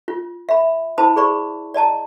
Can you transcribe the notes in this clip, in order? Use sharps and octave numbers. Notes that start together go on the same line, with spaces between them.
F4
E5 B5
E4 C5 A5 B5 D#6
G#4 C5 D5 B5 C#6
D5 D#5 A5 A#5